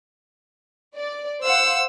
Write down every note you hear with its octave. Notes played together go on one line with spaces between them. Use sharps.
D5
C5 F5 F#5 E6